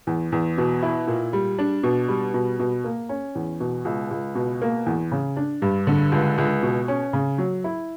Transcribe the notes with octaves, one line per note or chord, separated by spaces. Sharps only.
E2
E2
B2
E4
A#2
G3
D4
B2
G3
B2
B2
A#3
C#4
E2
B2
C#2
C#2
B2
A#3
E2
C#3
D4
G2
D3
C#2
C#2
B2
C#4
C#3
F#3
E4